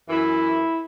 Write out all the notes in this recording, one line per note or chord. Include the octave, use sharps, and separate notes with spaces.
F#2 E3 E4